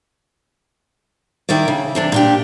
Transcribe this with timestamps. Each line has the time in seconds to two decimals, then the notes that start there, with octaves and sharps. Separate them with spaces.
1.49 D#3 E4 A#4 D5
1.68 C#3
1.95 C3 E3 D4
2.12 A#2 D4 G4